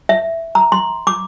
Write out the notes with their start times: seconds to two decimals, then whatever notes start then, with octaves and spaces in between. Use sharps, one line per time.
0.09 E5
0.55 A#5
0.72 C6
1.07 D6